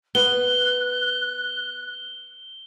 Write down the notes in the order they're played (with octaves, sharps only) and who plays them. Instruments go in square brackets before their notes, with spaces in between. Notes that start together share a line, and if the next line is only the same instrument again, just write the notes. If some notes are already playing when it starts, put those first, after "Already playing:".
[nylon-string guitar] B3 [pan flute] F#6 [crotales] G7